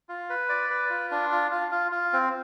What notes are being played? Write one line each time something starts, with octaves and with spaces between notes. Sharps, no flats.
F4
B4
D5
B4
F4
D4
F4
F4
F4
F4
C4